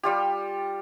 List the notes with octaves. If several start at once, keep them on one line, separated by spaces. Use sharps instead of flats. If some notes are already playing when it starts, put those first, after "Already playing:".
G3 F4 G4